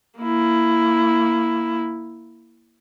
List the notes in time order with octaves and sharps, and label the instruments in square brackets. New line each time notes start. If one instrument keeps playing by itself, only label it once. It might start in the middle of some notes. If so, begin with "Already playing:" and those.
[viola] A#3 E4